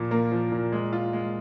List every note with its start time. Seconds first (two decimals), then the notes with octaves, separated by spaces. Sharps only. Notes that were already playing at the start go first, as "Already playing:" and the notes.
Already playing: A#2 F3
0.11 A#3
0.32 F3
0.52 A#2
0.72 G#3
0.93 F4
1.13 G#3